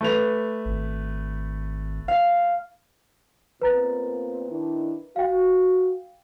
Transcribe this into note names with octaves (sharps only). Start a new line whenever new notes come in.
A3 B4 F7
G#1
F5
A#2 B3 C4 B4 A#5 A6
D#3 D4 E4
F#4 F5 G5